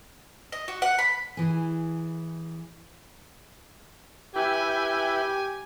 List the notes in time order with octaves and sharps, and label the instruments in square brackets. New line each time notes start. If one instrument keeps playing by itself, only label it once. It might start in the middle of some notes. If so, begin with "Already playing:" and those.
[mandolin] D#5
F#4
F#5
B5
[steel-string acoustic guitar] E3 G#4
[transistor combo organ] E4 B4 G5 [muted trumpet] G4 [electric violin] G#5